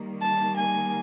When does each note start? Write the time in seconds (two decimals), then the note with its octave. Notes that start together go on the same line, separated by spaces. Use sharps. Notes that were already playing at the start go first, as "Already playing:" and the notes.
Already playing: D#3 G3 A#3
0.21 A5
0.56 G#5